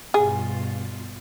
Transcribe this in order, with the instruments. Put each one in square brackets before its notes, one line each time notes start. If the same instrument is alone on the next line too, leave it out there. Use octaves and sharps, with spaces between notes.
[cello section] G2 B2 F4 [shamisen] G#4